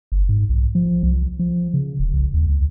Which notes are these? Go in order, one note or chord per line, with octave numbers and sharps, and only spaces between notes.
G1
G#2
B1
F3
C2
F3
C#3
D#1
C2
D#2
C#2